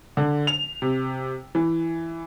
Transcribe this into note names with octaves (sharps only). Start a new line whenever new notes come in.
D3
F7
C3
E3